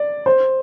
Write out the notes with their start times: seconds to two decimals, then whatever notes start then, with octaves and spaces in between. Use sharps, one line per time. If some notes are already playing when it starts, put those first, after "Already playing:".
Already playing: D5
0.26 C5